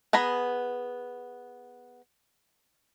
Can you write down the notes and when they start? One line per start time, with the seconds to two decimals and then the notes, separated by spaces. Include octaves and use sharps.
0.13 B3 G#4 A#5 B5